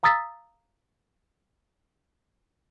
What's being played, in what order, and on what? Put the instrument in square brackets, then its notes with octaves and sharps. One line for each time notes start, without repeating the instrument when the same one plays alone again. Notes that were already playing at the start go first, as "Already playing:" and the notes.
[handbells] F5 A#5 D#6 E6 A6 B6